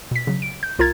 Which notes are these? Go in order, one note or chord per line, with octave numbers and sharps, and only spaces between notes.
B2 B6
C#3 F#3
D7
G6
C2 F4 A#4 A#5 G#6 A6